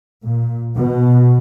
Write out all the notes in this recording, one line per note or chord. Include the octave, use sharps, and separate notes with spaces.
A#2
B2